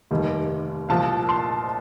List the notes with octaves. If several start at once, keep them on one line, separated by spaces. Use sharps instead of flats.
F1 D#2 D#3 G3
C2 A#2 F3 F5 A5
A5 C6